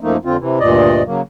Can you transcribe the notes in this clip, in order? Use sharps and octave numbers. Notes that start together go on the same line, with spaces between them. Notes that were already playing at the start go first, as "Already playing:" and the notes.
F#2 F3 A3 A#3 D#4
F2 D3 C4 F4
C3 E3
D2 G2 A#2 D5 D#5
C#3 F#3 A#3